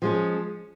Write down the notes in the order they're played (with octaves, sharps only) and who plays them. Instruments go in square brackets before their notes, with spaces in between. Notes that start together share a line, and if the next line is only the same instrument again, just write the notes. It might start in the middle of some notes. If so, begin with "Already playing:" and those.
[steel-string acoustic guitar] F3 G#3 C#4